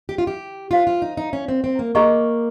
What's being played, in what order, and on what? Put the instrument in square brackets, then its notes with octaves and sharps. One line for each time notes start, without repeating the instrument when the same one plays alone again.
[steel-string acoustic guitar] G4
F4
G4
[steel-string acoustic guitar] F4 [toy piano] C5 F5 C6
[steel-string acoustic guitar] F4
D#4
D#4
C#4
C4
C4
A#3
[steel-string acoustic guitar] A#3 [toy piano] G#4 D#5 A#5 C#6